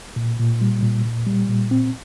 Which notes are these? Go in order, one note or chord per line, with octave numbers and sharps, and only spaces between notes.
A#2
A#2
G3
A#2
A#2
G3
A#2
C4